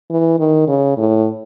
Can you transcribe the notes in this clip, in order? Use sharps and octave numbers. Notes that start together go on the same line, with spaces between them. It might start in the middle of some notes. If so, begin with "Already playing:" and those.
E3
D#3
C#3
A2